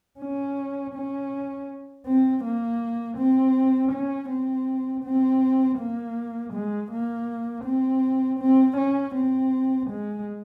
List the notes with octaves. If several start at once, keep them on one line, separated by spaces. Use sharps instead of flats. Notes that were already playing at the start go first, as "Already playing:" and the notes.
C#4
C#4
C4
A#3
C4
C#4
C4
C4
A#3
G#3
A#3
C4
C4
C#4
C4
G#3